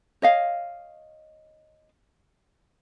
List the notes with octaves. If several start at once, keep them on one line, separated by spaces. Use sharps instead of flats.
C#5 D#5 F5